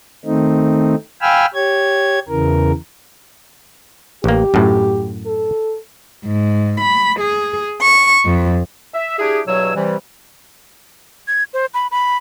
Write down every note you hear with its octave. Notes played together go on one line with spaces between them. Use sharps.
D#3 A3 C4 D#4
F5 G5 G#5 B5 E6 F6
G4 C#5 G#6
E2 C#3 E3 A#4
A1 A#3 G4
F#2 A2
A4
G#2
B5
G#4
C#6
F2
E5
D4 E4 G4 G#4
E2 G2 B2 F#3 C#5 E6
C3 E3 G3
G#6
C5
B5
B5